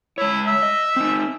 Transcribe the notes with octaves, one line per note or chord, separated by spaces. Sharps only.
G#3 E4 C#5
E5
D#5
C4 D#4